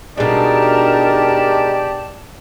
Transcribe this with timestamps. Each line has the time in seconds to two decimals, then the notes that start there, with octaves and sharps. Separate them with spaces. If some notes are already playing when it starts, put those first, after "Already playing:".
0.18 B2 G#3 D4 D#4 G4 A#4 D5 A5